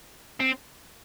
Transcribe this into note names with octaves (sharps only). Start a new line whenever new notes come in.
C4